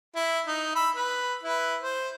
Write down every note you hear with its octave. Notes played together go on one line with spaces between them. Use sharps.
E4
D#4
B5 E6
B4
E4 B4
C5